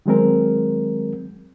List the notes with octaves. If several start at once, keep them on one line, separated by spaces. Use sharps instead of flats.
D#3 F#3 G#3 C4 A#4